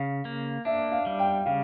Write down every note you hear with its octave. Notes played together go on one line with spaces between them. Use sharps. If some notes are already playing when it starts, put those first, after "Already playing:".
Already playing: C#3 F5
A#3
D4 E5
F5
G3
G5
C#3 F5